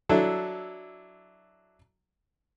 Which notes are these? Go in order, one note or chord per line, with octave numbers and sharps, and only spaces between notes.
F#3 D4 E4 A4